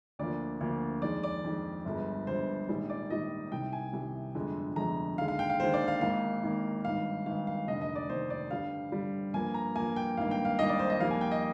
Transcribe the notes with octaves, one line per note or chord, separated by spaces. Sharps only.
D2 D3 F3 A#3 D5
D2 D3 F3 A#3
F2 D#3 G#3 D5
D5
F2 D#3 G#3
G1 G2 F3 G#3
G1 G2 F3 G#3 C5
A#1 G#2 D#3 G3
D5
A#1 G#2 D#3 G3 D#5
C2 C3 D#3 G5
G#5
C2 C3 D#3
G1 F2 D3 F3 G#3
G1 F2 D3 F3 G#3 A#5
D#2 D3 G#3 F5
F5
G5
F5
D#2 D3 G#3 C5
D5
F5
G#1 G#2 D#3 A#3 F5
G#1 G#2 D#3 A#3
G#1 G2 D#3 F5
G#1 G2 D#3 F5
F5
F1 D#2 D3 D#5
D#5
D5
F1 D#2 D3 C5
D5
G2 D3 G3 F5
G2 D3 G3
G2 F3 A#3 G#5
A#5
G2 F3 A#3 G#5
G5
G#1 G2 D#3 A#3 F5
G5
F5
G#1 G2 D#3 A#3 D#5
D5
C5
D#5
F2 D#3 G3 A#3 F5
G#5
G5
D#5